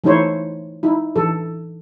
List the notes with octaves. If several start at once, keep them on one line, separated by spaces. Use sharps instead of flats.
E3 A3 D#4 E4 C5 C#5
D#4 E4
E3 A4